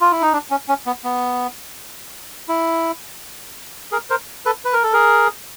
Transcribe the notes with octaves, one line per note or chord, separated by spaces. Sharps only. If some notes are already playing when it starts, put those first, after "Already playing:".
F4
E4
D#4
D4
C#4
C#4
B3
B3
E4
G#4 A#4
A#4 C5
A4 B4
B4
A#4
A4
G#4 A#4